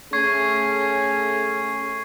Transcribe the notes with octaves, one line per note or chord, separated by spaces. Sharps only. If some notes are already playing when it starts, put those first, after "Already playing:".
A3 C#4 G#4 C#6 G#6 C7